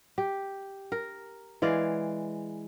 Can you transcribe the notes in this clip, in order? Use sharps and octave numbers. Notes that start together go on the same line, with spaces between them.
G4
A#4
E3 G#3 D5 F5